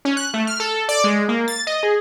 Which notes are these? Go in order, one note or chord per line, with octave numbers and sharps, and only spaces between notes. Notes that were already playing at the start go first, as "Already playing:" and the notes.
C#4
F#6
A3
F6
A4
D5
G#3
A#3
A6
D#5
G#4